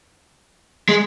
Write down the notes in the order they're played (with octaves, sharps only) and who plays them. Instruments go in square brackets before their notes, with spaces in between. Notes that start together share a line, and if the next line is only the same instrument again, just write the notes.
[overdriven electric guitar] G#3